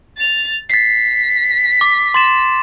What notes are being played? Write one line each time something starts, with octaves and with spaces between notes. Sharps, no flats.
A6 F7
A6 B6 C7
D6
C6 A6 E7